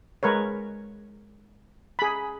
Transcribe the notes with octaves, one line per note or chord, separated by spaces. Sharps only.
G#3 A#4 B4 C#5
G#4 B5